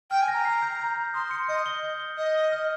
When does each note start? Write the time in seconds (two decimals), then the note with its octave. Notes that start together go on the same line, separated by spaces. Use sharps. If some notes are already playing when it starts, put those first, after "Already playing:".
0.11 G5 F6
0.22 G#5
0.28 A#6
0.34 A#5
0.45 C7
0.62 G6
0.80 G6
0.96 G6
1.14 C6 D#6
1.31 C#7
1.48 D#5 D#6
1.66 G7
1.83 G6
2.00 G7
2.17 D#5 G6
2.34 G7
2.52 F6